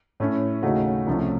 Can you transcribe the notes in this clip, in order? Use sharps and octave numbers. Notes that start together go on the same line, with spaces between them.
A2 A3 C#4
D#2 C#3 A3 D#4 F#4
C2 C3 F3 A3 C#4